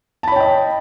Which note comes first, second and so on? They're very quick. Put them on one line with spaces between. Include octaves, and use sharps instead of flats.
A5 B5 C#5 G5 D#5